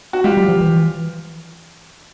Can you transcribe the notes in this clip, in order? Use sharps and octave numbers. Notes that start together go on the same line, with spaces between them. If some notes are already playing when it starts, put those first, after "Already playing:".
F#4
G#3 F4 G4
G3
F3
E3